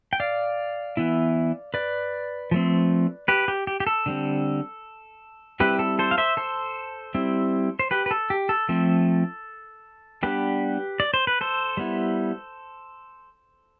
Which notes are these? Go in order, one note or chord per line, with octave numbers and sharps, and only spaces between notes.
G5
D5 F5
E3 B3 E4
B4 D5
F3 A3 C4
G4 B4
G4
G4
G4
A4
D3 G3 C4
G3 C4 E4 G4 B4
A4
A4 C5
F5
C5 E5
A4 C5
G3 C4 E4
C5
G4 B4
B4
A4
G4
A4
F3 A3 C4
G3 B3 D4 G4 B4
D5
C5
B4
A4 C5
G3 B3 E4